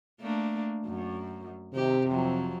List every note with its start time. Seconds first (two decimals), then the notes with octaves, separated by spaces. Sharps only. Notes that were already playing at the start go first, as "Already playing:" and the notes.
0.21 A3 A#3 D4
0.86 F#2
1.74 C3 D#3 G4
2.09 F2 F#3